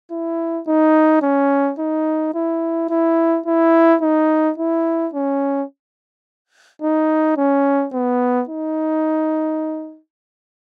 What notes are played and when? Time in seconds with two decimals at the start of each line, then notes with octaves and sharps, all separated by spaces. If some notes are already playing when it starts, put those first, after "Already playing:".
0.11 E4
0.67 D#4
1.22 C#4
1.79 D#4
2.34 E4
2.90 E4
3.46 E4
4.02 D#4
4.58 E4
5.14 C#4
6.82 D#4
7.37 C#4
7.93 B3
8.49 D#4